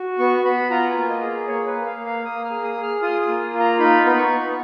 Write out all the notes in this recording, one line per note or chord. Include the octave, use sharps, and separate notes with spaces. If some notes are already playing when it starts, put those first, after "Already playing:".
Already playing: F#4
B3 C#6
B3 B5
F4 A#5
G#5
A#3
D#5
G#4
A#3 C#5
B4
A#3
F5
A#3
F5
A#3 D#6
F6
G#4
D#6
G#4
F6
F4 D#6
D#6
A#3
F4
A#5
D#4 B5
B3 B5
C#6
B3